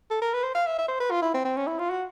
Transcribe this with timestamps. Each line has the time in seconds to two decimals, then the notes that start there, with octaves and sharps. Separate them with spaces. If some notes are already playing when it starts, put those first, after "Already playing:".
0.11 A4
0.22 A#4
0.33 B4
0.43 C5
0.55 F5
0.67 E5
0.78 E5
0.88 C5
1.00 B4
1.11 F4
1.22 E4
1.34 C4
1.45 C4
1.57 C#4
1.67 E4
1.79 F4
1.90 F#4